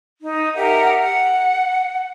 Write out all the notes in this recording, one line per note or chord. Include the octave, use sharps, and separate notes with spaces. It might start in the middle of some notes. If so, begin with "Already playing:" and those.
D#4
G4 A#4 E5 F#5
F#5